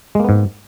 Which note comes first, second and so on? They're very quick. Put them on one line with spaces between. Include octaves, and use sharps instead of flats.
G#3 A#3 B3 G#2